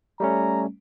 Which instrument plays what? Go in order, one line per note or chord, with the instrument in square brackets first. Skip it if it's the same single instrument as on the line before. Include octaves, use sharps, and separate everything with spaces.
[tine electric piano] G3 A3 C#4 [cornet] A#5